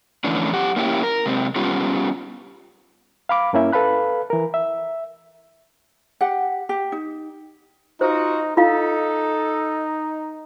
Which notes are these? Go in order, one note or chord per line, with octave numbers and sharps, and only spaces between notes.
D3 E3 F3 A3 C#4 D4
F#2 G4 F#5
A#3 C#4 E4 G4
A#4
C3 G#3 C4
G3 B3 C#4 F4 G4
F5 B5 D6
G2 A#3 C#4 E4 E5
A4 B4 F5 B5 F#6
E3 A#4
E5
G4 F#5
G4
D#4
D#4 F4 F#4 C5
D#4 F4 A4 F5